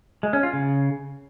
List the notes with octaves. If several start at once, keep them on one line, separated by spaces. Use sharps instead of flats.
G#3
C#4
F4
C#3